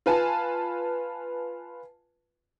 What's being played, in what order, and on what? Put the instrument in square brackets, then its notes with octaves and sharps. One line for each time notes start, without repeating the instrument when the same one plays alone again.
[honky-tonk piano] F4 B4 G#5 A5